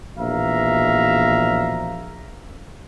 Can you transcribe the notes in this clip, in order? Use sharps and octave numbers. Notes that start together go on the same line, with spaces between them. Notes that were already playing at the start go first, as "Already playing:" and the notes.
A#1 B2 E3 E5 F5 A#5